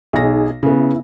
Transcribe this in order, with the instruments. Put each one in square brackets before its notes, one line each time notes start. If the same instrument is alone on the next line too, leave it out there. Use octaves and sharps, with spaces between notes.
[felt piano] B1 A#6 [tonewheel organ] D#4 G#4
[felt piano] C#3 B3 [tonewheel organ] E4